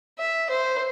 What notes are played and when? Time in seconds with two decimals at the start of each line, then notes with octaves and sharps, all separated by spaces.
0.19 E5
0.50 C5